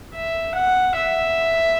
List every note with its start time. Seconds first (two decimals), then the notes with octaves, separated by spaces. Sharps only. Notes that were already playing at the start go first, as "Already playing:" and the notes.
0.15 E5
0.55 F#5
0.96 E5